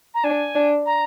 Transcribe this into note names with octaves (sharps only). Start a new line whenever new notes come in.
A#5
D4 G#5
D4
A#5